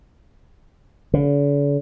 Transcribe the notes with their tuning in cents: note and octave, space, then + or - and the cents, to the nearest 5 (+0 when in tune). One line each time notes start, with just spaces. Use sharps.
D3 -45